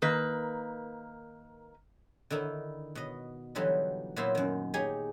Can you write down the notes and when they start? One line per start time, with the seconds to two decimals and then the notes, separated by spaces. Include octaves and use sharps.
0.02 D#3 A#3 B4
2.30 D3 D#3 D#4 E4
2.95 B2 D#5
3.55 D3 E3 F#3 G3 D#4 F4
4.16 A#2 F#3 B3 E4 F4 C5
4.35 F#2 D#3
4.74 D#4 G4 G#4 C#5 G#5